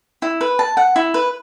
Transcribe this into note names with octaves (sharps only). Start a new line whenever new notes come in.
E4
B4
A5
F#5
E4
B4